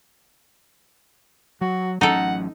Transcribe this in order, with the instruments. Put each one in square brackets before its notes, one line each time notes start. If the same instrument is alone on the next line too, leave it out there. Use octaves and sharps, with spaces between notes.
[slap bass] F#3 [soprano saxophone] F#4
[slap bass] A1 F#3 C#4 [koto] D#4 A4 [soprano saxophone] F#5